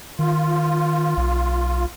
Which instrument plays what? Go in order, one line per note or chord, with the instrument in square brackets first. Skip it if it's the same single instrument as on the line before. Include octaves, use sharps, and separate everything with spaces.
[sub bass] D#3 [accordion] F4
[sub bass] B1